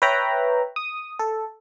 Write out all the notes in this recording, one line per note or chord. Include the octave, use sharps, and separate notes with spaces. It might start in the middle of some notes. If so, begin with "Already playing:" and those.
B4 C#5 E5 G5 A#5 B5
D#6
A4